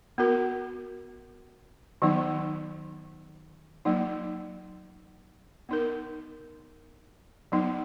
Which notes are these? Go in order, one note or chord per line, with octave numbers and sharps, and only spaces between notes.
B3 F#4 A#4
D#3 F#3 B3 D#4
F#3 A#3 D#4
B3 D#4 A#4
F#3 B3 D#4